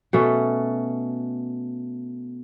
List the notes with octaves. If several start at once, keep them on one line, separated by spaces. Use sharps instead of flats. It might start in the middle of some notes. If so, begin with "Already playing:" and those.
B2 A3 C#4